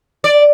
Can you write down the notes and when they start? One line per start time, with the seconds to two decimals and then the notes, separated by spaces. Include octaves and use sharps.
0.24 D5